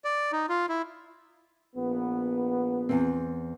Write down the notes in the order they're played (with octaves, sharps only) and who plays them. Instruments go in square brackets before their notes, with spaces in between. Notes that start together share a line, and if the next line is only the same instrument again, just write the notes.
[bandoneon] D5
D#4
F4
E4
[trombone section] A#1 B3
[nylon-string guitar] E2 C4